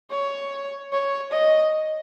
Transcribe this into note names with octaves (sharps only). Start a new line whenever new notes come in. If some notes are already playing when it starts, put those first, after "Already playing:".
C#5
C#5
D#5